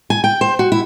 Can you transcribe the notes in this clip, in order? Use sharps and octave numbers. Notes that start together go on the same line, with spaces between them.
G#5
G5
C5
F#4
E4